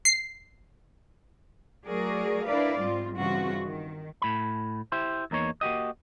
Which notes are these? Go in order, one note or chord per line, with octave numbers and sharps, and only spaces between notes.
C7
F#3 A3 F#4 G#4 A#4 D5
D4 E4 A#4 B4 D5 F5
G#2 G3 C4 F4
G2 C#3 E3 C4 F4 F#4
D#3
A2 B5
E4 G4 C5
E2 A#3 D#4 C#5
A#3 F#4 G4 D#5